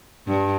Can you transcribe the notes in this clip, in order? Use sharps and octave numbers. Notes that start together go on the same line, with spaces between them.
G2